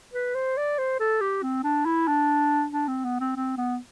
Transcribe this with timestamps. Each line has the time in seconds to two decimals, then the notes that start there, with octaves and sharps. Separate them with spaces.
0.14 B4
0.35 C5
0.57 D5
0.78 C5
0.99 A4
1.21 G4
1.43 C4
1.64 D4
1.85 E4
2.08 D4
2.72 D4
2.88 C4
3.04 B3
3.20 C4
3.36 C4
3.58 B3